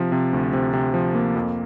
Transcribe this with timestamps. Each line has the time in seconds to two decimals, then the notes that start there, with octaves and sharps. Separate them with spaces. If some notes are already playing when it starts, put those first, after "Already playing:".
Already playing: C3 F3
0.12 C3
0.33 D2
0.53 C3
0.73 C3
0.94 F3
1.15 A#3
1.36 F2